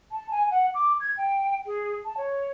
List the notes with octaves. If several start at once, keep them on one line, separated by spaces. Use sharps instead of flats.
A5
G#5
F#5
D6
G#6
G5
G#4
A5
C#5